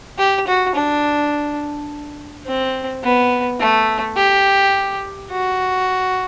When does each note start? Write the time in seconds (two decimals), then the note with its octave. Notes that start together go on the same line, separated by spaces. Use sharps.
0.19 G4
0.47 F#4
0.76 D4
2.46 C4
3.03 B3
3.60 A3
4.17 G4
5.31 F#4